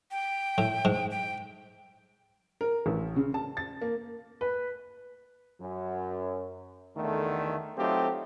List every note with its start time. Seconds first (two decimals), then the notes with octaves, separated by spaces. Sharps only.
0.11 G5
0.58 A2
0.85 G#2
1.11 G5
2.61 A#4
2.86 A1
3.16 C#3
3.34 A5
3.57 A6
3.81 A#3
4.41 B4
5.60 F#2
6.97 E2 D3 D#3 A3
7.78 F#3 A3 C4 D#4 F4 G4